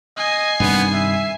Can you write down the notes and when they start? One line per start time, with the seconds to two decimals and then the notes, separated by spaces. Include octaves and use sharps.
0.17 D#5 G#5 C7
0.60 G2 C3 D#3 B3
0.93 E5